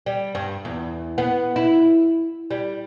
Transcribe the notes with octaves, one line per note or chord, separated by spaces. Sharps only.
G3
G2
E2
B3
E4
G3